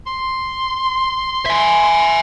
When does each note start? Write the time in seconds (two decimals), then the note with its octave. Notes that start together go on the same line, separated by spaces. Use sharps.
0.07 C6
1.46 E5 G#5